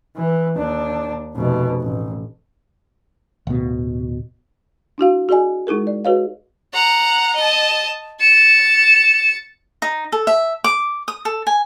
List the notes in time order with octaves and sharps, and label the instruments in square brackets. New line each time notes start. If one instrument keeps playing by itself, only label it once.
[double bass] E3
D#2 D4
F1 B2
A1
[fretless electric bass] D1 B2
[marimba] D4 E4 F#4 F5
F#4 G#4 D5 D#5 G#5
G#3 D#4 E4 G#4 A#4
D5
F#4 G#4 B4 C#5 D#5 F5
[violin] F#5 A#5
D#5 A5
[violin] A6 C#7 [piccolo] E7
[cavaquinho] D#4
A4
E5
D6
D#6
A4
G#5